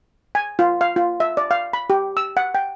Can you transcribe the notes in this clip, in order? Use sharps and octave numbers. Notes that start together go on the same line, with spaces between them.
G#5
F4
F5
F4
E5
D5
F5
B5
G4
E6
F#5
G5